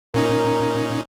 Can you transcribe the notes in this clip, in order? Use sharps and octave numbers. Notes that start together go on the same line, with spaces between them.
A#2 C#4 D#4 A#4